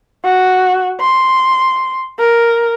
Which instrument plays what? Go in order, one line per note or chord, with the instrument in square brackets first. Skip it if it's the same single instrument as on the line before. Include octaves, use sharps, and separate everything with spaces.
[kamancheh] F#4
C6
A#4